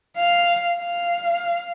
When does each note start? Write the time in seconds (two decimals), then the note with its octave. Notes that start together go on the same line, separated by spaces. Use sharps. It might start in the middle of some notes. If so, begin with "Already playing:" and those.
0.17 F5
0.79 F5